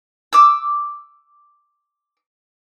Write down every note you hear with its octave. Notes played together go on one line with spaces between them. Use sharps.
D6 E6